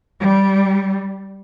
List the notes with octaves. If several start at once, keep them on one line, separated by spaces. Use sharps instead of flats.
G3